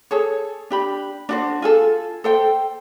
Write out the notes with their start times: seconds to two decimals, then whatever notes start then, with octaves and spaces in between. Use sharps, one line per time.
0.11 G#4 A4 C#5
0.70 D4 G4 B5
1.29 D4 F#4 C5
1.62 F4 G#4 A4
2.24 A4 C5 G5